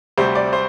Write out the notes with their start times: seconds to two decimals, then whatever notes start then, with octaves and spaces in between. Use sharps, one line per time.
0.18 D2 C3 G3 C5
0.35 D5
0.53 C5